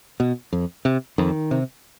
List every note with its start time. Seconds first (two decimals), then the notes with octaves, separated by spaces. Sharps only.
0.20 B2
0.53 F2
0.85 C3
1.18 F2 D#3
1.51 C3